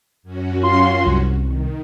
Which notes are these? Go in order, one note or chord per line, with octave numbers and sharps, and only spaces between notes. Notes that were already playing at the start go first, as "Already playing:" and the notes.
F#2 C#4 F#4
F4 C6
C2
D#3